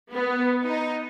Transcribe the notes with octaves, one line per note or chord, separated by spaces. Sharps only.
B3
D#4